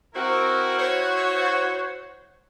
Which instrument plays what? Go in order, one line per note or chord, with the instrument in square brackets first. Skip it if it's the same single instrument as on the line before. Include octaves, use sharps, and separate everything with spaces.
[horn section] C4 A#4 [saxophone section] E4 F#4
[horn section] C5 C#5